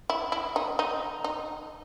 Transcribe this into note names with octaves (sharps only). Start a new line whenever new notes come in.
E4
E4
D#4
D#4
D#4